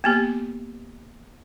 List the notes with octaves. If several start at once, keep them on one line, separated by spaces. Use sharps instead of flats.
A#3 B3 G4